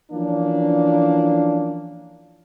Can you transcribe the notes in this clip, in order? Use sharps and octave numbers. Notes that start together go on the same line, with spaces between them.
E3 F3 A#3 C#4 D4